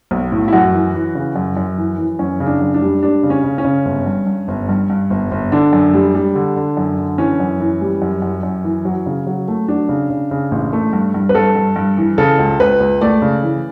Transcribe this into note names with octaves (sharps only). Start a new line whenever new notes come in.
B1
A2
E4
F#2 F#4
E3
E3
C#3
F#2
F#2
E3
E3
F#2 C#4
C#3
D4
F#2
D4
G3
G3 D4
C#3
C#4
C#3
C#4
C#3
G1
G2
G2
G1
G2
G2
G1
G1
D3 D4
F#2
G3
G3
D3
D3
F#2
D3
E3 C#4
F#2
E3
G3
F#2
F#2
F#2
E3
F#3
C#3
F#3
A3
F#3 D4
C#3
C#3
C#3
A1
A3
G2
G2
B4
G2 A4
G2
G2
E3
C#3 A4
C#2
C#2 B4
C#2
A3 D5
C#3
E3